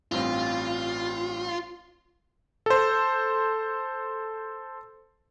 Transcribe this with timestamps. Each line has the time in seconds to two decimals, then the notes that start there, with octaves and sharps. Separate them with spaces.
0.12 A1 G2 C4 F4
2.66 A4 C5